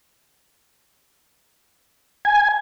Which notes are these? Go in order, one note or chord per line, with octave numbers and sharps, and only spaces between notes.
G#5